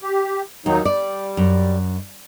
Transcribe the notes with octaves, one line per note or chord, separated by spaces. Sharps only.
G4
D#2 D#3 F#3 D#4
G3 D5
F#2